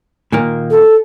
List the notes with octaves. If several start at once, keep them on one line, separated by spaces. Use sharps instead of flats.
A#2 D#3 A#3
A4